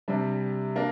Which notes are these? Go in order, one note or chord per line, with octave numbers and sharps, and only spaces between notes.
C3 G3 D4
A#3 D4